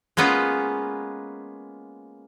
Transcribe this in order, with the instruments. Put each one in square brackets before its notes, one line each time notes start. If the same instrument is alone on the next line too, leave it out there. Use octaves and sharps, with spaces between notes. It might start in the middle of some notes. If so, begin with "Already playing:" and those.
[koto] G#3 A#3 B3 C#4 F4